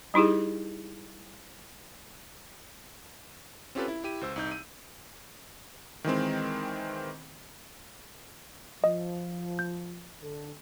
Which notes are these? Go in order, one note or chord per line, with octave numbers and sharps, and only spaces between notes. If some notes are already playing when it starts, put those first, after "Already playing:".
G3 D#4 E4 G4 G#4
C4 C#4 F4 G4 A4 B4
E4
E4 G4 D#7
C#2 C5 E6
C2 D#4 G6
D#7
D#3 E3 G#3 C4
F3 D#5
G6
D3 A4